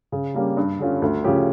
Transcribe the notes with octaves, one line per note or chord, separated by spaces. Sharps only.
C#3
G3 A#3 C#4 G4
G2
D3 G3 C#4 F4
D2
C#3 F3 C#4 G4